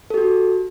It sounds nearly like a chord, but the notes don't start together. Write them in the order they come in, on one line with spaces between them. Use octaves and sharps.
A4 G4 F#4